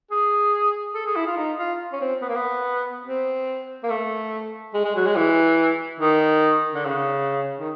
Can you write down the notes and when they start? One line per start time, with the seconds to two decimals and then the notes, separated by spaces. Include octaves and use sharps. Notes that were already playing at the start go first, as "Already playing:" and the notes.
0.11 G#4
0.95 A4
1.06 G#4
1.16 E4
1.27 F4
1.37 D#4
1.59 F4
1.93 C#4
2.01 C4
2.21 B3
2.29 A#3
2.36 B3
3.06 C4
3.84 A#3
3.90 A3
4.74 G#3
4.85 G#3
4.96 F#3
5.06 G#3
5.16 E3
6.00 D#3
6.75 D3
6.85 C#3
7.60 D#3